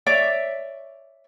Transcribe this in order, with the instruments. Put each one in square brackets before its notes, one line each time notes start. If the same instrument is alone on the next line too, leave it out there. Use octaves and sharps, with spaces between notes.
[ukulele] C#5 D5 E5